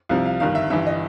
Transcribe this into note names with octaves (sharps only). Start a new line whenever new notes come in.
C2 C3 F3 F5
F5
G1 G2 D#3 F5
E5
G1 G2 E3 E5
D#5